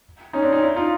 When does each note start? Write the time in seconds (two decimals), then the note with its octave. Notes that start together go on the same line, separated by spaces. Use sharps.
0.33 C#4 D#4
0.42 C4 D4
0.52 C#4 D#4
0.62 D4 E4
0.76 D#4 F4